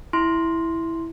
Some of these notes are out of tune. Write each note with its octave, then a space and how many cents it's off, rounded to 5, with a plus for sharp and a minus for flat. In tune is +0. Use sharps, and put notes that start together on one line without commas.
E4 +0 C6 +0